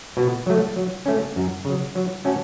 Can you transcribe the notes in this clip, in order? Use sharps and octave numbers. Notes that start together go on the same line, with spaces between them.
B2
F#3 A3
F#3
A3 C#4
F#2
C#3 F#3
F#3
A3 C#4 F#4 A4